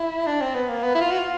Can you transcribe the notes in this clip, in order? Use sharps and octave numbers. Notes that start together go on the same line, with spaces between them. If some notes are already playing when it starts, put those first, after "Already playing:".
Already playing: E4
D4
C4
B3
A#3
B3
E4
F4
F#4
F4